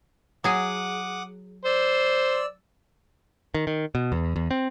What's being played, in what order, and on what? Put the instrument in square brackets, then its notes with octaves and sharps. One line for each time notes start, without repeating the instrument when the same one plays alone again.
[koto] F#3 G#4 [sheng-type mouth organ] F#5 D6 D#6
[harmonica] C5 [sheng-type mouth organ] D5 E6
[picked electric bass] D#3
D#3
B2
E2
E2
C4